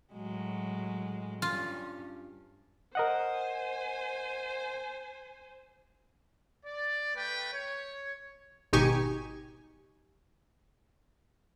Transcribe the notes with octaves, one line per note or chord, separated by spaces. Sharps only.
A2 F#3 G#3
G2 C#4 F4
A#4 C5 D#5 F#5 G#5
D5
A3 B4 G5
C#5
G#1 B2 D#4 G4 G#5 C#6